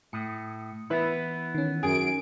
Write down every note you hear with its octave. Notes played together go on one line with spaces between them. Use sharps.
A2 D#6 C#7
E3 B3 E4 B4
D#3 C#4
F#2 G#4 D7